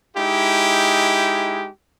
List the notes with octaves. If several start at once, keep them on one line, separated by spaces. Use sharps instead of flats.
G#3 D#4 E4 G4